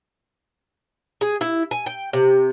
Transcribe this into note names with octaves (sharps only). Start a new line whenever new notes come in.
G#4
E4
G#5
G5
C3